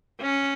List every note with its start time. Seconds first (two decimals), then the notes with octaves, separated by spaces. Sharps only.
0.21 C#4